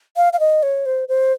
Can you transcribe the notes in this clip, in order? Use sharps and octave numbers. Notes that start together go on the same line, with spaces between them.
F5
F5
D#5
C#5
C5
C5